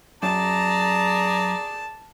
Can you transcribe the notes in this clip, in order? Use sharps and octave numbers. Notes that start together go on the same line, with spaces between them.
F#2 G#4 D5 A5 A#5